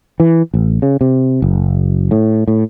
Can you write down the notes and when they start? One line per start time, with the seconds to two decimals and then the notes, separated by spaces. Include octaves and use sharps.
0.20 E3
0.54 A1
0.82 C#3
1.01 C3
1.42 F#1
2.11 A2
2.48 A2